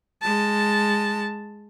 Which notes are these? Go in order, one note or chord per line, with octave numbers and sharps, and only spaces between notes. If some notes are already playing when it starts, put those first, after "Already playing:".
G#3 A5